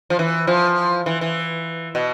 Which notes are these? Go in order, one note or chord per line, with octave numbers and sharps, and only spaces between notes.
F3
E3
F3
E3
E3
B2